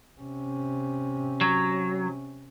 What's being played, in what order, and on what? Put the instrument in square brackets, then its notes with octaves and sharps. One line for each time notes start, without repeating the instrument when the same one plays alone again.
[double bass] C3 C#4
[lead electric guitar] F#3